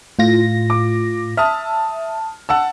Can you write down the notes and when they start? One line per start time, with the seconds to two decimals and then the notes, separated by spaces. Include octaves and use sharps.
0.19 A2 F4 A#6
0.70 D6
1.37 E5 A5 D#6 F6
2.49 F#5 A5 E6